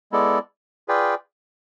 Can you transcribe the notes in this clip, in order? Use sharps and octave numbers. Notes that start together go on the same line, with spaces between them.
G#3 B3 E4 A4 D5
F4 G#4 B4 D5 G5